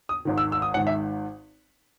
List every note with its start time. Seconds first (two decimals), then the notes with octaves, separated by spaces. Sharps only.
0.09 D#6
0.25 G#1 G#2 D#3
0.38 E6
0.52 E6
0.62 D#6
0.74 G#1 G#2 D#3 F#5
0.87 E5